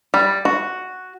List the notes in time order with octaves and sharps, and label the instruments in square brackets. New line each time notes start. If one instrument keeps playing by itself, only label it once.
[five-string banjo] G3
F#4